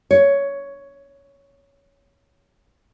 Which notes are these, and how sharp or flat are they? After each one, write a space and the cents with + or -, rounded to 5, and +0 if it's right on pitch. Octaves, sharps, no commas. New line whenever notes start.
C#5 +10